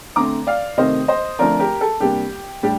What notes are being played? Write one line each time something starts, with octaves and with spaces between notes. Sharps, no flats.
D3 A3 C4 A#5 D6
D5 F5
C3 D#3 A3 C4 C5 D#5
C5 D#5
D3 F3 A3 C4 A#4 D5
G4 A#4
A4
C3 G3 A#3 D4 G4
A2 G3 D4 G4